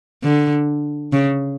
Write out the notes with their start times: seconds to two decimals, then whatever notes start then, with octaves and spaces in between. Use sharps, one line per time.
0.24 D3
1.13 C#3